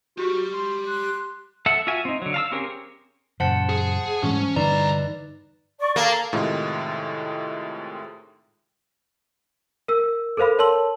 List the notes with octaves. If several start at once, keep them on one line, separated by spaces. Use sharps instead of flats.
F#4 G4 B5
C6
C6 F#6
A4 E5 F#5
F4 F#4 E5 G#5
C4 D#4
D3 F#3
F5 A5 E6
C4 C#4 G4 G#4 A#4
F#2 A#2 C#3 C5 F#5 A5
G#4
G#2 E3 G3 C#4
C2 G2 D3 E3 D#4 B4 D5 A#5
D5 C#6
A#3 A4 F5
A2 C3 D#3 G#3 F4
A#4 E6
A4 A#4 C5 F5 B5
A#4 C#5 A5 C6 E6 F#7